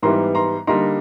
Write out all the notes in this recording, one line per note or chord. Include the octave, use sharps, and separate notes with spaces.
G#2 E3 G3 B3 A#5 C6
A#5 C6
D3 G3 A#3 D#4 A#5 C6